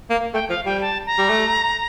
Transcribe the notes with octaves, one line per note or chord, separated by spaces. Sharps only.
A#3
A3 G5
F3 F5
G3 G5
A5
A#5
G3
A3